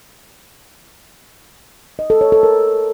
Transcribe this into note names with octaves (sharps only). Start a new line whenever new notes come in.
D#5
A4
C#5
A4
A#4